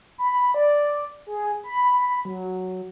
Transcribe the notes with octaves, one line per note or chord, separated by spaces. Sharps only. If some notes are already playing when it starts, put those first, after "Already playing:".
B5
D5
G#4
B5
F#3